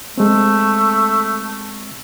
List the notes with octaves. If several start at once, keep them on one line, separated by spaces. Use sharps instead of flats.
G#3 A3 C4